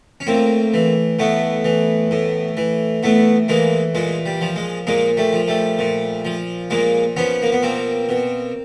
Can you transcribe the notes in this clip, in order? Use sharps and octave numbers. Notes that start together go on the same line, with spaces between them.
C#4
A2 A#3 C4
E3
A2 A3 B3
E3
A2
E3
A2 A3 B3
E3 G#3 A#3
A#2 G#3
G3
F3
G#3
A#2 G#3 A#3
G3 A3
F3
G3 A3
A#2
F3
A#2 G#3 A#3
F3 B3 C#4
A#3
B3
B2 A#3 C4
B2